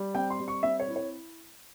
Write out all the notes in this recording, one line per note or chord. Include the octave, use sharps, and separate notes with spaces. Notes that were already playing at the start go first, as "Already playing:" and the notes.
Already playing: G3
C4 G5
C6
G3
C#6
C4 E5
C#5
E4
C#5